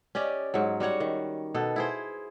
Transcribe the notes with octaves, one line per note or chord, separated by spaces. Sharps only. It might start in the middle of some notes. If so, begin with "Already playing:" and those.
C#4 G4 D5 D#5
G#2 F#3
G3 F#4 C#5 F#5
D#3
B2 B3 A4
E4 G#4 C5